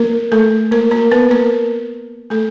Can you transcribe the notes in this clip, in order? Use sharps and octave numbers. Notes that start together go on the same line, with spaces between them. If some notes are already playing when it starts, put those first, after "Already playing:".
Already playing: A#3 A#4
A3 A4
A#3 A#4
A#3 A#4
B3 B4
A#3 A#4
A3 A4